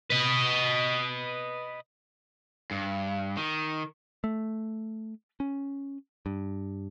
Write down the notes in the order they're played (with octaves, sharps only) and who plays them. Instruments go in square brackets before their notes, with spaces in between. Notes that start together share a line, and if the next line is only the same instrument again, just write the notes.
[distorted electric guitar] B4 D#5
[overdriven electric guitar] G2
D#3
[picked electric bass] A3
C#4
G2